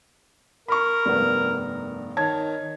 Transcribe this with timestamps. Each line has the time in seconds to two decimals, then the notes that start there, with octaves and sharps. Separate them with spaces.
0.68 A#4 B5 C#6
1.06 F1 G2 B3
2.17 D#3 C#5 A5 G#6